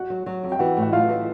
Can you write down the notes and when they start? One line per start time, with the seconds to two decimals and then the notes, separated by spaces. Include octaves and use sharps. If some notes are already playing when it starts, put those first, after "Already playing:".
Already playing: F#4 F#5
0.10 F#3
0.26 F#3
0.44 F2
0.52 G5
0.59 E3 F#4 F#5
0.77 A2
0.82 F#5
0.92 A2 F4 F5
1.09 E3